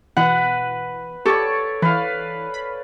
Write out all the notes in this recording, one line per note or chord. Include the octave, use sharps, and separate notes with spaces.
B2 E3 B4 F#5
G4 A4 C#5 D5 C#6
E3 B4 F5
B5